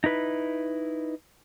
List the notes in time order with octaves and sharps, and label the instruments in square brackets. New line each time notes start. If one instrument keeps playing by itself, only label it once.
[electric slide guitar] D#4 E4 B4